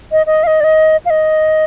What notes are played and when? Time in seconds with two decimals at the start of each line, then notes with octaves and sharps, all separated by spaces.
0.12 D#5
0.27 D#5
0.44 F5
0.47 D#5
0.61 D5
0.64 D#5
1.05 F5
1.10 D#5